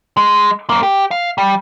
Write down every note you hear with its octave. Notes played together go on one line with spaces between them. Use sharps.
G#3
F#2 A#3
G4
F5
G3